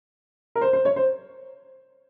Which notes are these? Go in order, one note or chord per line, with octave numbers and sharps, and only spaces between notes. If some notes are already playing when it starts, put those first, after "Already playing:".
A#4
C5
C5
C#5
C5